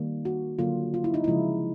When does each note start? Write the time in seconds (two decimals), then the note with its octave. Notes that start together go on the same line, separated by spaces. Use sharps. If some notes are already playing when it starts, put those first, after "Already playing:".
Already playing: D#3 G3 A#3
0.25 F#4
0.59 D3 F#3 A#3 F4
0.94 F4
1.04 E4
1.14 D#4
1.24 C#3 F3 G#3 E4